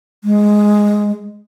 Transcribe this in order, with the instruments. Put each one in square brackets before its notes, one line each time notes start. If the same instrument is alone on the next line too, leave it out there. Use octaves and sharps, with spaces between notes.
[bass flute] G#3